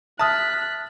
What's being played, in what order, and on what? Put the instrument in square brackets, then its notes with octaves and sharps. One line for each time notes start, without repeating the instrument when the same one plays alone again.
[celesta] E5 F6 A6 [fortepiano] A5 D#6 [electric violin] F#6 B6